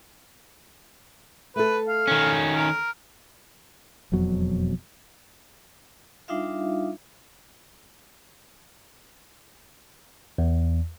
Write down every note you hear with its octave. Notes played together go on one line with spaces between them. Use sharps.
A3 A4 B4
F5
D#3 C#4
A#4
E1 F2 B2 F#3
G3 D4 D#4 F4 E5 F5
E2